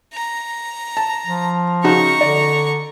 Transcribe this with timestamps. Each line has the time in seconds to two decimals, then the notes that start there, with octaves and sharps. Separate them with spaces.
0.14 A#5
0.97 A5
1.27 F3
1.84 C#3 D#4 F#4 A#5 C#6
2.21 D3 D5